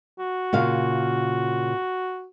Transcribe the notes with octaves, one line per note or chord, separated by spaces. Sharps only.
F#4
A#2 C#3 F5